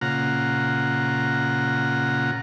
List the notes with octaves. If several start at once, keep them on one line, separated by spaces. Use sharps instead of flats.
A#2 C#3 F4 F#5 A#5